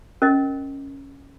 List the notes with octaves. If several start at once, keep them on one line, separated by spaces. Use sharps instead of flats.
C#4 A#4 D#5